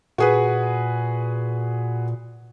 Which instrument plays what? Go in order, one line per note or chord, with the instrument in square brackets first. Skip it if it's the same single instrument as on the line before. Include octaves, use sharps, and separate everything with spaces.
[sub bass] A#2 [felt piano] F#4 G#4 B4